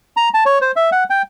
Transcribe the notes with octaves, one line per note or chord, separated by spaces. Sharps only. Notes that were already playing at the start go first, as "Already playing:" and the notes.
A#5
A5
C#5
C5
E5
F#5
G5